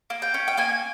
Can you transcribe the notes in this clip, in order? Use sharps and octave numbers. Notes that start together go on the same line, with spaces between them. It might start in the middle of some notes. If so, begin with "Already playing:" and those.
A#3
G5
C#4
G5
A#3 G#5